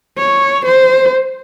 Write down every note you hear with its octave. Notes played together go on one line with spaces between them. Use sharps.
C#5
C5